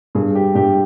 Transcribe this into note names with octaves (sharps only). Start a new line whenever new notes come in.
G2 G#4
G4
G2 G4